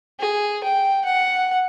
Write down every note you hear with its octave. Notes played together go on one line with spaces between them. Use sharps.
G#4
G5
F#5